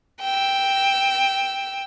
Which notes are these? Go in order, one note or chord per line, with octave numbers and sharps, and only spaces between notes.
G5 E6